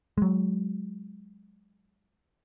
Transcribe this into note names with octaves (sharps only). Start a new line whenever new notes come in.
F#3 G#3